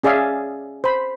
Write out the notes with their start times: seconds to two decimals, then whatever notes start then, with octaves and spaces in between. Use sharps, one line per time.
0.03 C#4 G#4 D5 E5 F5
0.84 C5 B5